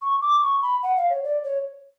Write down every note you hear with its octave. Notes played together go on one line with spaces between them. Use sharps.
C#6
D6
C#6
B5
F#5
F5
C#5
D5
C#5